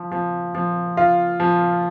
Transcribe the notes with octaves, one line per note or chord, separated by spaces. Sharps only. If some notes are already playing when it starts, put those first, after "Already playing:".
Already playing: F3
F3
F3
F4
F3